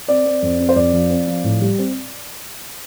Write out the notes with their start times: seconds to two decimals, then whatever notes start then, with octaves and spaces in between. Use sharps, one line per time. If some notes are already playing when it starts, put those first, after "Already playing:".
0.08 C4 D5
0.25 C4
0.42 F2
0.60 C4
0.69 C5
0.76 F2 D5
0.93 F3
1.10 C4
1.28 F3
1.44 A2
1.61 G3
1.78 C4